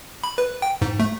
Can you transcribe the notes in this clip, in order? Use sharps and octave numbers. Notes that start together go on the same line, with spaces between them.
B5
B4
G5
G#2
A3